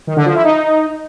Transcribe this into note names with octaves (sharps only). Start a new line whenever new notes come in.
D#3
D3
F3
E4
D#4